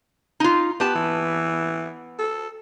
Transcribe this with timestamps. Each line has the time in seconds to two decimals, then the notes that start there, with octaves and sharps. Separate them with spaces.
0.40 D#4 F4
0.80 B3 G4 A5
0.95 E3
2.19 A4